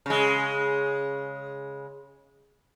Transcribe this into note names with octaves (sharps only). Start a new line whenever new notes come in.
C#3 G#3